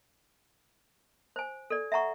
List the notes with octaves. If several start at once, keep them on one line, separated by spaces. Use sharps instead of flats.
C5 G#5
A4 D5
E5 F#5 A#5 C#6